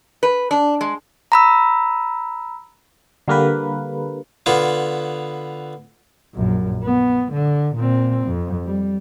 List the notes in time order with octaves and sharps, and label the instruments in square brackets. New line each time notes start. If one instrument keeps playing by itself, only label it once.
[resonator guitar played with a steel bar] B4
D4
G#3
[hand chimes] A#5 B5 E6
[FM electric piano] D3 G3 A#3 A#4 B4
[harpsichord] D3 B3 F4 C#5
[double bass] A#1 F#2
B3
D3
A#2 C4
F2
G3